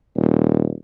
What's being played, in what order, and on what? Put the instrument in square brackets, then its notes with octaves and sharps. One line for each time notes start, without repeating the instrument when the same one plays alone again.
[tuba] D#1